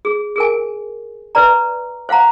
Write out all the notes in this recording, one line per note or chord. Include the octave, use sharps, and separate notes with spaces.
G#4
G#4 A#4 G#5
B4 D5 A#5
C5 F5 F#5 A#5